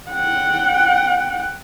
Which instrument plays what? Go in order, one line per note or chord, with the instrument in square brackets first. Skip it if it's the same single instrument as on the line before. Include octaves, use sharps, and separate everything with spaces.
[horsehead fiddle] F#5 G5